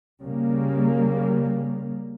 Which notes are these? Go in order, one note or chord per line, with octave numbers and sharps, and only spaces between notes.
C#3 G3 A#3